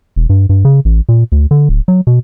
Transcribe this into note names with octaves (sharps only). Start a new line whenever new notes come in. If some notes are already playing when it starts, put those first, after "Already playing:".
E1
G2
G2
C#3
A1
A#2
D2
D3
D1
F#3
B2